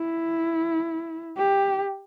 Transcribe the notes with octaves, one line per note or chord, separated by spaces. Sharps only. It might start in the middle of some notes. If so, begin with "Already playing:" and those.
Already playing: E4
G4